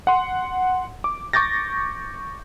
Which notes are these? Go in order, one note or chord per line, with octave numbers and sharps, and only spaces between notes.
F#5 C6
D6
C#6 D6 G6 A6 A#6